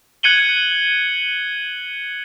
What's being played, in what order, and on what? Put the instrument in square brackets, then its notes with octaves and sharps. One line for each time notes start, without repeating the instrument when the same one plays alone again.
[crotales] F#6 G#6 C#7 D#7 F#7 G7